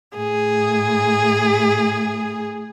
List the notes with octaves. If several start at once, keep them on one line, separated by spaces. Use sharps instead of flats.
A2 G#4